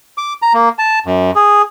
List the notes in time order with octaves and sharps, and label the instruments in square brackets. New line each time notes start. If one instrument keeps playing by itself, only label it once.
[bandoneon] D6
A#5
A#3
A5
F#2
G#4